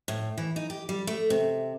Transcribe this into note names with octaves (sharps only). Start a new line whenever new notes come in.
A2
E3
D#4
G4
G3
A3
C3